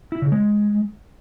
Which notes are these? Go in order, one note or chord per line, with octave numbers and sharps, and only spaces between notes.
E4
C#3
G#3